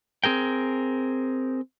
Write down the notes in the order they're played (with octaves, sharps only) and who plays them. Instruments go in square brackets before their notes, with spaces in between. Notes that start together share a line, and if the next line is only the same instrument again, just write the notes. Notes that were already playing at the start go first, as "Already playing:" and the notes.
[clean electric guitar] C4 G#4 A#4 G5